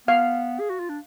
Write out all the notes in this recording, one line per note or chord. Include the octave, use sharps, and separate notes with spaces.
B3 F5
G#4
F#4
F4
D4